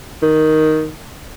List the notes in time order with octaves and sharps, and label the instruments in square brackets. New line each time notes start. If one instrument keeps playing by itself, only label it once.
[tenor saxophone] D#3